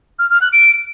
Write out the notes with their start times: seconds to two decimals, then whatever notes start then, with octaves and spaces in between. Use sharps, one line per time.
0.19 F6
0.30 F6
0.41 F#6
0.53 D7